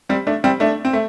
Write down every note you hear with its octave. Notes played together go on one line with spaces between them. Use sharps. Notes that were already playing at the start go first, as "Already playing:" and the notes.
G3 C4
A3 D4
G3 C4
A3 D4
C4
A3